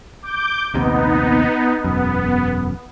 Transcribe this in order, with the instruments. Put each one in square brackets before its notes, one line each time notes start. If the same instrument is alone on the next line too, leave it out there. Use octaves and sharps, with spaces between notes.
[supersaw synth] D6 G6
[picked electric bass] A#1 D#2 C3 [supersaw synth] B3 D#4
[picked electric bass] E1 F#2 [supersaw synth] B3